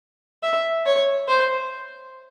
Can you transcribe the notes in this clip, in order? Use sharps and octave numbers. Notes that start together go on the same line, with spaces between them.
E5
C#5
C5